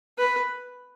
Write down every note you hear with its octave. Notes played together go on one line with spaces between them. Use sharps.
B4